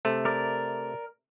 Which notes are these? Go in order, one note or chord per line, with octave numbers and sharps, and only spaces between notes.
C3 A3
A#4 D5